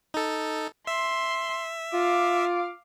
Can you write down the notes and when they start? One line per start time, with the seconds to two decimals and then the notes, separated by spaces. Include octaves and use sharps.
0.14 D#4 A4
0.87 E5 C6
1.94 F4 F5 D6